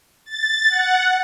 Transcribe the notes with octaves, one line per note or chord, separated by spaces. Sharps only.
A6
F#5